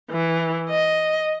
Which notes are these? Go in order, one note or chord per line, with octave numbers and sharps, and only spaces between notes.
E3
D#5